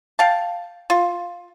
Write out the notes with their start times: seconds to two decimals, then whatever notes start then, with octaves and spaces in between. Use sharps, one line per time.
0.19 F5 G5 A5
0.90 F4